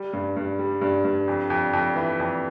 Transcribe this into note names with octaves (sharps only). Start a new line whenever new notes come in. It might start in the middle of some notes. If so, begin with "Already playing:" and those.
Already playing: G3
G2
G2
G3
G2
G2
F2
F2
F2
E3
F2